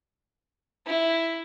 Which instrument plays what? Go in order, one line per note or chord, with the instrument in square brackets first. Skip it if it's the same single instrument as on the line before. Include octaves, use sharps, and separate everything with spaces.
[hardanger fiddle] E4